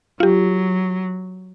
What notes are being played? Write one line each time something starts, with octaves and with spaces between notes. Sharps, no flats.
F#3 F4 G4